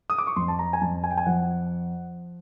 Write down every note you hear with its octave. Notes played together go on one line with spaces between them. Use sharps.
D#6
D6
C#6
F2 C6
A5
A#5
G#5
F2 A5
G#5
G5
G#5
F3 F#5